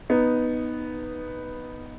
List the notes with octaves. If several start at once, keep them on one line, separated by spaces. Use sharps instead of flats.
B3 D#4